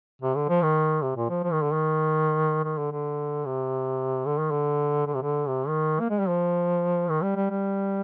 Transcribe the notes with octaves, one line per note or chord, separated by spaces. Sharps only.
C3
D3
F3
D#3
C3
A#2
F3
F3
D#3
D3
D#3
D#3
D3
D3
C3
D3
D#3
D3
D3
C3
D3
C3
D#3
A#3
G#3
G3
F3
D#3
G3
G3
G3